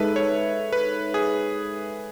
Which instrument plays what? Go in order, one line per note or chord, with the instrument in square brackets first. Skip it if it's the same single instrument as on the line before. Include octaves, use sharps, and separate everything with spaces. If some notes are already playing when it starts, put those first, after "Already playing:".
Already playing: [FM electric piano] G#3 D#4 A4 E5 [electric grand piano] B4
[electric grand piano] C#5
B4
G#4